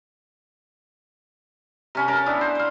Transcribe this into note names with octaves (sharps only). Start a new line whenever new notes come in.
C3 C#4 B5
C#4 A#4 A5
B3 D4 E4
C5
C5 F5